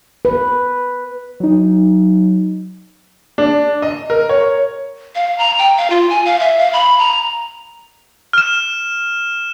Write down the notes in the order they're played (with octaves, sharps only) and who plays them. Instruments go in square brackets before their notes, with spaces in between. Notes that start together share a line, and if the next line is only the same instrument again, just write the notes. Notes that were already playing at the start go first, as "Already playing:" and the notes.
[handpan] B4
[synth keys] F#3 D#4
[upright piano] D4
D#5
A#4
C#5
[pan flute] F5
A#5
G5
F5
F4
G#5
F5
E5
F5
B5
A#5
[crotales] F6 E7